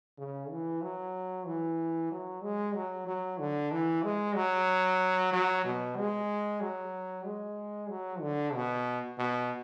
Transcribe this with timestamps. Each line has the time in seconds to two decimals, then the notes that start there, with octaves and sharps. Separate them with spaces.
0.18 C#3
0.50 E3
0.82 F#3
1.46 E3
2.11 F#3
2.43 G#3
2.75 F#3
3.07 F#3
3.39 D3
3.72 E3
4.03 G#3
4.36 F#3
5.32 F#3
5.64 B2
5.97 G#3
6.61 F#3
7.26 G#3
7.90 F#3
8.21 D3
8.54 B2
9.18 B2